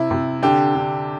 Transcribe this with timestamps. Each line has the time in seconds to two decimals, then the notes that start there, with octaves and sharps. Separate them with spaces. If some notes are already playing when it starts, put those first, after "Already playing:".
Already playing: C3 E4
0.11 C3
0.42 D3 G4
0.75 D3